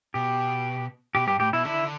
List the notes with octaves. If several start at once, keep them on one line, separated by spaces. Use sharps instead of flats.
B2 G4
B2 G4
G2 G4
A2 G4
B2 E4
D3 E4